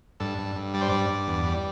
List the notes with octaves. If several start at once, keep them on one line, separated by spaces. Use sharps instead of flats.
G2 A4
G2
G2
G3 D5
C5
G2 D5
G2
E2
G3